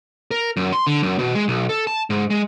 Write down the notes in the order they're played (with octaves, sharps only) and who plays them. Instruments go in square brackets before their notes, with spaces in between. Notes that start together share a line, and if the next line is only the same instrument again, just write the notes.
[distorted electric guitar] A#4
F#2
C6
D3
F#2
B2
G#3
B1
A4
A5
G#2
G#3